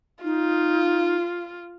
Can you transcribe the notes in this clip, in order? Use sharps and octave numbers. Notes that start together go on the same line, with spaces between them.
D#4 F4